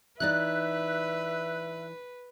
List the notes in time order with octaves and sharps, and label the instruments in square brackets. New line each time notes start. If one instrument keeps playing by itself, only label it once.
[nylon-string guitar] E3 D#4 D5 [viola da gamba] B4 [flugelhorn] E5 [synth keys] F#6